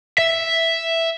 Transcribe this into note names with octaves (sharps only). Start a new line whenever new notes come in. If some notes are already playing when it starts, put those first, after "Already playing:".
E5